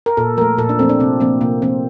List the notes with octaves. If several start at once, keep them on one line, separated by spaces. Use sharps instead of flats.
A#4
A#2 A4
F3 A3 A#4
A#2 A4
D4
F3 A3 C4
D4
C3 C4
F3 A#3 C4
C3 A#3
F3 A#3 C4